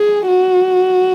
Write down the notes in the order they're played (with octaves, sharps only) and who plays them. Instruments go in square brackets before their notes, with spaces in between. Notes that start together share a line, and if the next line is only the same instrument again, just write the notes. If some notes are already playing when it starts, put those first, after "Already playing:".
Already playing: [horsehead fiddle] G#4
F#4